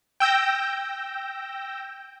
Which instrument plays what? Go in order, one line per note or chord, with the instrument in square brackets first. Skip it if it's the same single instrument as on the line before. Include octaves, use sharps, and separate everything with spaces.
[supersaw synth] G5 E6 G6 A#6